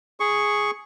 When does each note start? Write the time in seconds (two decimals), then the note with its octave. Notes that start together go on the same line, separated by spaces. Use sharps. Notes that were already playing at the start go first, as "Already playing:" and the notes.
0.20 G#4 C#6